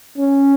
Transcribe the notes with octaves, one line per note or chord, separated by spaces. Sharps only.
C#4